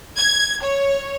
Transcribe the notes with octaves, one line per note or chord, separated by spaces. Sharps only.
G#6
C#5